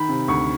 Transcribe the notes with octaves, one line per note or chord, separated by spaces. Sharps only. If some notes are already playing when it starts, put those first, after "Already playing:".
Already playing: D#3 B5
C3
D2 C#6